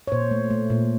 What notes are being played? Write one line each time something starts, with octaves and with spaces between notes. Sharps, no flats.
C#5
A#2 C5
A3
A3
A#2